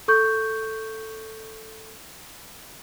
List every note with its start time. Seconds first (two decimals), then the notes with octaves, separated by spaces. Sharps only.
0.08 A4 C#6 G6